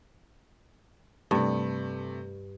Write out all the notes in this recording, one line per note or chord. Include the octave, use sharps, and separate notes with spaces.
G2 C3 A3